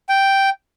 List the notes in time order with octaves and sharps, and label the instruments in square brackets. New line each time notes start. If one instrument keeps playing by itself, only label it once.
[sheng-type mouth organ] G5